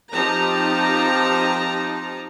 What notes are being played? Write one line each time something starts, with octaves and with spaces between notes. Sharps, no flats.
F3 C4 D#4 G4 A5 A#5